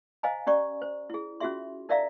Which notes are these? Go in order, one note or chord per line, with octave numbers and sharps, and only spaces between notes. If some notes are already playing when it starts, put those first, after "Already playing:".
C5 D#5 F5 G#5 A#5
C#4 G4 D5 A#5 C#6
C5
E4 G#4
C#4 F4 F#4 G#4 E5 C6
D#4 A#4 D5 E5 F5 A#5